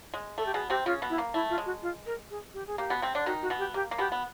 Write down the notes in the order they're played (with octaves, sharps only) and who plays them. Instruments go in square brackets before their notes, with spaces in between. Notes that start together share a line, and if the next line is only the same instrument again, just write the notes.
[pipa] G#3
[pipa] A3 [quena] A4
[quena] G4
[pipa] B2 B3 [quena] G#4
[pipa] C3 C4 [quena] G4
[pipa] C#3 C#4 [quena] F4
[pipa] B2 B3
[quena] E4
[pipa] A#3
[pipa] A3 [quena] E4
[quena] F4
[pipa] G#3
[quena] F#4
F4
A#4
G#4
G4
G#4
[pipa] A#3 [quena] G4
[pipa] B2 B3
C3 C4
D3 D4
[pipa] D#3 D#4 [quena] F#4
[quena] F#4
[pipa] B2 B3
[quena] G4
[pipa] A#3 [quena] G4
[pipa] A#3
[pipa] B2 B3 [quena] G4
[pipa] B3